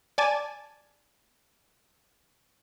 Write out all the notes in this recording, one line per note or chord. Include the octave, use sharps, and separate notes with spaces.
D5 G#5 A5